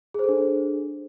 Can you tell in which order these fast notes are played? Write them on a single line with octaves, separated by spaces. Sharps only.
G#4 C5 A4 D4